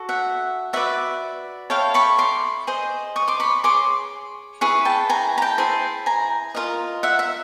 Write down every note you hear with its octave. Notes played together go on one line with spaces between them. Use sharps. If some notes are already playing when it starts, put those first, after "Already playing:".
Already playing: F#4 A4
E5 F#5
F#4 B4 D5 E5 F#5
E4 A4 C#5 F5 G5
B5 C#6
C6 D6
G#4 C5 D#5
C#6 D#6
C6 D6
B5 C#6
G#4 C#5 C6 D6
E4 G#4 B4 C#6
G5 A5
G#5 A#5
A#5
G5 A5
E4 G#4 C5
G#5 A#5
F4 A#4 D#5
E5 F#5
E5